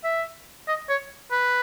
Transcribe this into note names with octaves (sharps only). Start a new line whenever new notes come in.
E5
D#5
C#5
B4